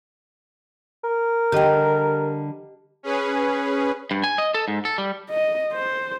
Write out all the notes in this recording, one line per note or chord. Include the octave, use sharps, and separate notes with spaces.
A#4
D3 G3 G4 D#5 G5
C#4 G#4 B4
G2
G#5
D#5
A4
G#2
A4
G3
D#5
C5